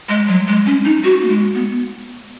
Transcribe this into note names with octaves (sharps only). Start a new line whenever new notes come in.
G#3
F#3
G#3
C#4
D#4
F#4
A#3
G#3
B3